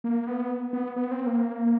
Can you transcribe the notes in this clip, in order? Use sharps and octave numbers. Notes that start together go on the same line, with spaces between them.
A#3
B3
B3
B3
C4
A#3